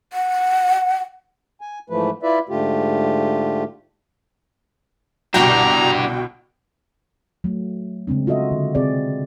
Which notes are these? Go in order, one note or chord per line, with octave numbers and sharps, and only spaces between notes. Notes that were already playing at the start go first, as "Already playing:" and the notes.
F#5
G#5
G#2 E3 F3 A3 B4
E4 F4 B4 D5 E5
G#2 D3 A3 F4 G4
G1 C2 B2 D4 F#4 G4 G5 A#5
F#3 A3
C#3 G#3 C4 D4
F4 F#4 A4 D#5 E5
D3
C3 C4 G#4 D5